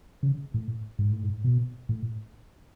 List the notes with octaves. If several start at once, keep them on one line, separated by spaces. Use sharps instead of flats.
C#3
A2
G#2
A2
G#2
B2
A2